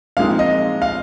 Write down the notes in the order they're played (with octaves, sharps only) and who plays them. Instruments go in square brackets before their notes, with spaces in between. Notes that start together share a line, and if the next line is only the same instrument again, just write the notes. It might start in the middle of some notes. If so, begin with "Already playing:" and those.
[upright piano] A#2 F3 G#3 C4 D#4 [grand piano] F5
[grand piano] D#5
F5